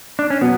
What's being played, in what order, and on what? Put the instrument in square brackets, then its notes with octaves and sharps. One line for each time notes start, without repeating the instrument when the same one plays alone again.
[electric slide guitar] D4
C#4
[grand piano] B2 F#3 [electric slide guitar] B3